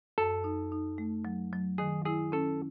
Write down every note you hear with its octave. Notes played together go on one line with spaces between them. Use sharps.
F#2 A4
D#4
D#4
A3
F#3
F#3
D#3 G#4
E4 G#4
C#4 A4